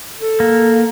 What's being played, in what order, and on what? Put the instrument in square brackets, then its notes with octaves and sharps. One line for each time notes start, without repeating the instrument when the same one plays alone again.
[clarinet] A4
[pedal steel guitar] A#3